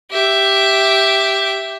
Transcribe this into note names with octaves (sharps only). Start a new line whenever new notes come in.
G4 E5